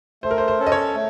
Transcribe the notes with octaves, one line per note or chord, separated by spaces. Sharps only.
A3 C5
A#4
C5
C5
C#4 A4
D#5
C#5
A3